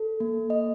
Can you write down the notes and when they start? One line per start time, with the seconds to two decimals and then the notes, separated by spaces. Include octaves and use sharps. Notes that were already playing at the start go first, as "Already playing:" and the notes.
Already playing: A4
0.20 A#3
0.50 D#5